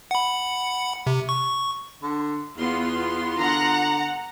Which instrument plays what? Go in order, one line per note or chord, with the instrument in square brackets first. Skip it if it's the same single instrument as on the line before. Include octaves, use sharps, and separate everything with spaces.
[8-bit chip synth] F#5 B5
C3
C#6
[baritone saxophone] D3
[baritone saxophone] E2 [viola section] B3 F4 C6
[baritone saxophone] D3 [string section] F#5 A#5